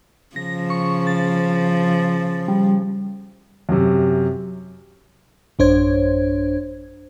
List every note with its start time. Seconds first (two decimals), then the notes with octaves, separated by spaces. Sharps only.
0.36 C#3 F3 A#6
0.70 C#6
1.07 A6
2.48 G3
3.69 F#2 C3
5.59 A1 F#2 D4 C5 C#5 G#6